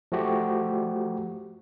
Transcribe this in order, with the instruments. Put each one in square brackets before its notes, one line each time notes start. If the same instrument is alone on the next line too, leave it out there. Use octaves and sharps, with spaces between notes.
[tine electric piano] F3 A3 F#4 G4